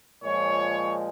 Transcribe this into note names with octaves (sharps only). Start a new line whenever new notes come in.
A#2 F3 G#3 C#5